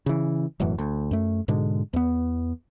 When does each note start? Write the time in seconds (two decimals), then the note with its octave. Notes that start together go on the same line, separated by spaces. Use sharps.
0.06 C#3 E3
0.60 E1 F#2 A2 E3
0.78 D2
1.11 F#2 A3
1.48 G#2 B2 D3 G#3
1.93 E2 B3